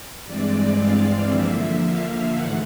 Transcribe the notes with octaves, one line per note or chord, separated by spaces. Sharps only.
G2 E3 G#3 C4 D5
F5
D3 F3 A#3 E5
F5
G#2 E3 A3 F#5